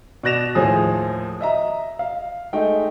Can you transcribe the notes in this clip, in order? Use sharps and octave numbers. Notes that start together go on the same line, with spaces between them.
B2 D5 F#6 A#6 E7 F7
D#2 A2 F3 G#4 D#6
D#5 E5 A#5
F5
G#3 A3 D#4 G5